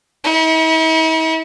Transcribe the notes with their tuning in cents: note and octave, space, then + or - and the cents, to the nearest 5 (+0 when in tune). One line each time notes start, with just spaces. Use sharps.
E4 -45